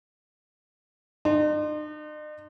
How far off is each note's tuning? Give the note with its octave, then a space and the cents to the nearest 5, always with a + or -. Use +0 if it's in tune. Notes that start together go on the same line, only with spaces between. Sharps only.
D#4 -45 C6 +0